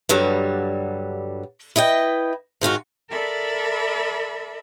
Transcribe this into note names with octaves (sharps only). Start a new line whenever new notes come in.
G2 D3 F#3 G3
E4 B4 D#5 G5
G#2 D#3 F4 F#4
A4 A#4 D5 E5 B5